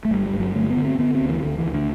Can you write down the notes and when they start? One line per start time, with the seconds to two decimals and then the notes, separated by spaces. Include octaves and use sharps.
0.05 A3
0.11 G1 G3
0.26 G3
0.33 G2
0.40 F#3
0.55 D3 A3
0.70 B3
0.77 D3
0.85 C4
0.99 D3 B3
1.14 C4
1.21 D2
1.29 E3
1.43 D2 D3
1.58 E3
1.65 D2
1.73 D3